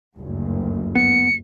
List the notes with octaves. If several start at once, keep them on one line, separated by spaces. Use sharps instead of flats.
F#1 D2 G2
B3 C#7